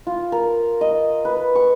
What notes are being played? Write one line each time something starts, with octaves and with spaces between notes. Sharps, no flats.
F4
A#4
D#5
B4
C#6